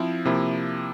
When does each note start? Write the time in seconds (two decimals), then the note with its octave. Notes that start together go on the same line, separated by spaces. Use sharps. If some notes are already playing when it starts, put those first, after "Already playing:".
Already playing: F3 C4 E4
0.25 C3 F3 A#3 E4